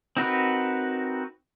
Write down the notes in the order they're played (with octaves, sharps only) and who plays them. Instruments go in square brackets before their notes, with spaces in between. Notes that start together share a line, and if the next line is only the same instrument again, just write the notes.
[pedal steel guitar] C4 D#4 F#4 A#4 B4